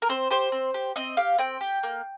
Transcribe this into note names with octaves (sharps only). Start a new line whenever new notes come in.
A#4
C4 C5
G4 C5
C4
G4
C4 D#5
G4 F5
C4 G5
G4
A#3